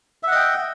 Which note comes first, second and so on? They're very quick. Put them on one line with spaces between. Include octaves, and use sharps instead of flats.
E5 F#5 D#5 G5